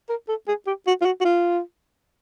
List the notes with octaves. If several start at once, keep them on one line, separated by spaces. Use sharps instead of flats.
A#4
A4
G#4
G4
F#4
F4
F#4
F#4
F4